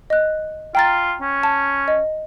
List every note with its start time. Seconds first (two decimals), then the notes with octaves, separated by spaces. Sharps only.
0.10 D#5 F#6
0.75 F4 G5 A#5 A6
1.21 C#4
1.43 A5
1.88 D#5